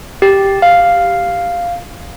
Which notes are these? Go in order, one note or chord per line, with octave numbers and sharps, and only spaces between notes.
G4
F5